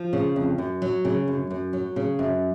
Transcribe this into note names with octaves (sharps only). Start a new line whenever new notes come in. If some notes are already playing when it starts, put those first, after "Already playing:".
Already playing: F3
C#3
F2
F#2
F#3
C#3
F#2
F#2
F#3
C#3
F#2